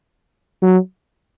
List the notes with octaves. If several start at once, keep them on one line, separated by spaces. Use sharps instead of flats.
F#3